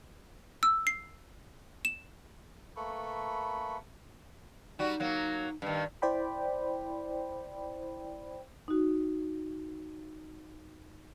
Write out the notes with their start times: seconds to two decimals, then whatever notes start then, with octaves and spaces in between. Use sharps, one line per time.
0.63 E6
0.87 C7
1.85 E7
2.76 A3 A#3 A4 B4 B5 C#6
4.79 G3 D#4 F#4
5.00 F#3 A#3
5.62 G2 D#3
6.02 E4 C5 D5 G5 B5
8.68 D#4 F#4